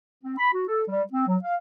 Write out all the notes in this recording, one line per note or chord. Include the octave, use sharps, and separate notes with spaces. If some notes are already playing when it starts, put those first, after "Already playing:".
C4
B5
F#4
A4
G3
C4
F#3
F5